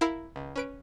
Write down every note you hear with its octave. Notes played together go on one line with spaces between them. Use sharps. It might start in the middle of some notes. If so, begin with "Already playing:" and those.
E4 A#4 E5 F5 B5
C#2
C#4 B4 D7